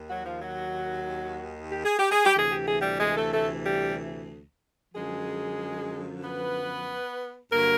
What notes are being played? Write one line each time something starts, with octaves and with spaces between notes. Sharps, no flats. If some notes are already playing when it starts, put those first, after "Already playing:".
Already playing: D#2 D#3
F#3 F#4
F3 F4
F#3 F#4
G4
G#4
G4
G#4
G4
D2 C3 E3 G#4
G4
G#4
G3 G4
G#3 G#4
A3 A4
A3 A4
G3 G4
F#2 D3 F3 G#3 G#4
B3 B4
G2 D3 F#3 A#3 A#4